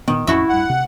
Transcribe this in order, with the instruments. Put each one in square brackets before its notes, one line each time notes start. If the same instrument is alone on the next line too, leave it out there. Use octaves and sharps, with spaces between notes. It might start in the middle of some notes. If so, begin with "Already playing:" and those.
[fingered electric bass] A#2 B3 [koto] D#3
[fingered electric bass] A1 F2 C#4 [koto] A3 F#4 E5 [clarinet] E4
[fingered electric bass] D1 G2 [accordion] F#5
[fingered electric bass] C3